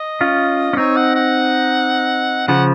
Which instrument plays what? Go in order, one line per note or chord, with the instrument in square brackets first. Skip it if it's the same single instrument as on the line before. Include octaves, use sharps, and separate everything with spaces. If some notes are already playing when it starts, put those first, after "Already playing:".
Already playing: [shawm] D#5
[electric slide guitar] C#4 F4
C#4
[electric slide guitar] C4 D#4 [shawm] C#5
[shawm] F#5
F#5
[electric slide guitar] C#3 F3 [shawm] F#5